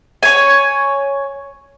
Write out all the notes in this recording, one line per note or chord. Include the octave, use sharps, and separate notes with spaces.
C#5 G#5